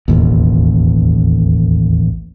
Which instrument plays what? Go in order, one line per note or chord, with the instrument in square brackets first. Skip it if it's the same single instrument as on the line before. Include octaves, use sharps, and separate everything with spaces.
[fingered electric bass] E1 A1 D#2